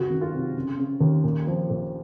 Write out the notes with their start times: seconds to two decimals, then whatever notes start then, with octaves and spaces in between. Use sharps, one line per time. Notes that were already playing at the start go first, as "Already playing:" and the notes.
Already playing: F#1 C#2 F#4
0.10 D#3
0.21 F4
0.33 C3
0.55 C#3
0.78 C#3
1.00 D#2
1.24 A#2
1.47 F3
1.70 A#1